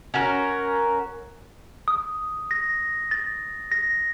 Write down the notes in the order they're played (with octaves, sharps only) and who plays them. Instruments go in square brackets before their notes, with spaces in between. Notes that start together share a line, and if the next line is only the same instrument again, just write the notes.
[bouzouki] C#4 F#4 A#4
[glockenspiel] D#6
A#6
A6
A#6